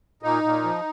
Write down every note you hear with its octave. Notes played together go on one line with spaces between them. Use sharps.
A#2 D#4
A#2
F3